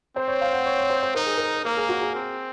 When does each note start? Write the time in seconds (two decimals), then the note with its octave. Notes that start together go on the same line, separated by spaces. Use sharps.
0.16 C4 C5
0.28 C#5
0.41 F5
0.53 F#5
0.66 C#5
0.78 C#5
0.90 C5
1.03 C5
1.15 D#4 A#4
1.26 G#4
1.37 A#4
1.65 A#3 A#4
1.77 G#4
1.89 F#4
2.01 G#4
2.15 C4